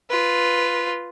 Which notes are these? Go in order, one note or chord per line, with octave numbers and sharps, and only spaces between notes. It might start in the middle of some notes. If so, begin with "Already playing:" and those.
F4 B4